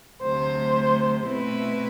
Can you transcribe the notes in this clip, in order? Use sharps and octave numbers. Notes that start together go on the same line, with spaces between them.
D2 C3 F#3 A3 C5
B2 A3 C4 E4 B4